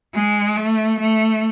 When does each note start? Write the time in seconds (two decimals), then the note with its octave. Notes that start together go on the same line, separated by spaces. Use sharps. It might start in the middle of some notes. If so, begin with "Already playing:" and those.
0.14 G#3
0.57 A3
1.00 A3